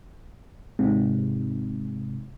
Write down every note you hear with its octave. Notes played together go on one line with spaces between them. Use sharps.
G#2 C3